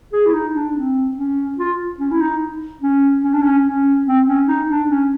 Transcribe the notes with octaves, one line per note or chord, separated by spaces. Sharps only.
G#4
E4
D#4
D4
C4
C#4
F4
C#4
E4
D#4
C#4
C#4
D4
C#4
C#4
C4
C#4
D#4
D4
C#4